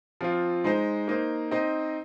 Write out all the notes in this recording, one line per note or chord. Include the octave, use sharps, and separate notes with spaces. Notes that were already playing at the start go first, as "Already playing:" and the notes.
F3 C4 F4
G#3 D#4 C5
A#3 D#4 C5
C4 D#4 C5 D#5